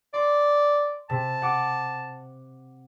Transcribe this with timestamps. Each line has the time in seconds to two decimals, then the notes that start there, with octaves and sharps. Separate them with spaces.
0.14 D5 C6
1.10 C3 A5
1.42 F#5 D6